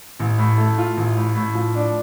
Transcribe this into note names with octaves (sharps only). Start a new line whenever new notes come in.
A1
A2
A3
F4
A1
A2
A2
F3
D4